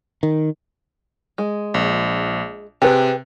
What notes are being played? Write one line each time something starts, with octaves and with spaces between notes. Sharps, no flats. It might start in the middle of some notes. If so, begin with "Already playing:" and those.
D#3
G#3
A#1
C3 G4 G#4 B4